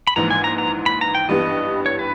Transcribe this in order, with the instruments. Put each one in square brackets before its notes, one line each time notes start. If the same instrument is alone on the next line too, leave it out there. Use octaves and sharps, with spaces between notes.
[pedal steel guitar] B5
[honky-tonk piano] A#1 G#2 E3 [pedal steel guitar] A#5
[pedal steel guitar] G#5
A#5
A#5
B5
A#5
G5
[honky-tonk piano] G2 E3 G3 B3 [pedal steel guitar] D#5
[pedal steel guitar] C#5
B4